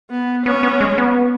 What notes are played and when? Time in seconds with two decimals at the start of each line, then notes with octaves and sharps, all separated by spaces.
0.11 B3
0.46 B3 C#4
0.63 B3
0.81 G#3
0.98 B3